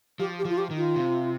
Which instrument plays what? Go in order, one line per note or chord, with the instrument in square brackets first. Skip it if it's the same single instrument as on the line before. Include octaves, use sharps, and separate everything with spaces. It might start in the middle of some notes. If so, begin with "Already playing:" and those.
[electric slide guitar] F3 [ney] G4
[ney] G4
[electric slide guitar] F3 [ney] F4
[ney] G4
[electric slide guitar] D#3
[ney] F4
[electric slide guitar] C3